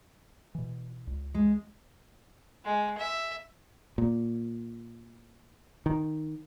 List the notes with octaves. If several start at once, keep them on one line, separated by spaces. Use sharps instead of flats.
B2 E3
C#2
G#3
G#3
E5
A#2
D#3